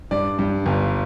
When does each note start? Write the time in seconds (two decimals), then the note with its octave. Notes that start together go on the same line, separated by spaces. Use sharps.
0.11 G2 D5
0.39 G2
0.66 G1